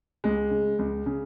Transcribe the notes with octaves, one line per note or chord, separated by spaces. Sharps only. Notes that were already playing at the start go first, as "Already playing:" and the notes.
C#2 G#3
C#3
C#2
C#3